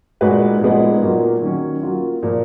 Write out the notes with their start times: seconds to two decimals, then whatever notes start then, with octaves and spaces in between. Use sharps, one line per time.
0.21 A#2 G#3 D#4 F#4 B4
0.61 A#2 F3 G#3 B3 D#4
1.02 A#2 F#3 A#3 F4
1.42 D#3 F#3 C#4
1.83 F#3 A#3 F4
2.23 A#2 F3 A#3